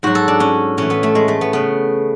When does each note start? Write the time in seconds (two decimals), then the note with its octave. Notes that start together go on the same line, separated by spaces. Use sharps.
0.03 G#2 F#3 F#4
0.15 A4
0.28 D4
0.40 C#4
0.77 A2 E3 C#4
0.90 B3
1.03 A3
1.15 G#3
1.28 A3
1.41 B3
1.53 C#3 B3